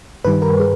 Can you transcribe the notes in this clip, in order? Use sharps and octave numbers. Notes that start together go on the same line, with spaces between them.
G2 D#3 G3 B4
A#4
G#4